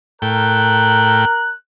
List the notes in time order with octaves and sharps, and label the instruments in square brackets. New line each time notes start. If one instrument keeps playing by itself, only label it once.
[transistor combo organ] A2 G5 [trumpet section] A#4 [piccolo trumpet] F#6